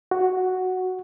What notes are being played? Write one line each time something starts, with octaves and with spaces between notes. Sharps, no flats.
F#4